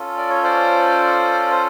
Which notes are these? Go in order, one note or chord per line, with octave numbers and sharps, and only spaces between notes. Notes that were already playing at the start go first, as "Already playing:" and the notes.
Already playing: C#4 F4 A4
D5
C#5
C5 D5
C5